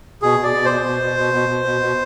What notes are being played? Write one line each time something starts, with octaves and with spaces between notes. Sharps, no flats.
B2 G#4
B2 D5
B2
C5
B2
B2
B2
B2
B2
B2
B2
B2